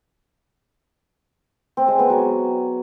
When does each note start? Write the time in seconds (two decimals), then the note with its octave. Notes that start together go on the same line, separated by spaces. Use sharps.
1.77 C4
1.88 G#3
1.99 B3
2.10 F#3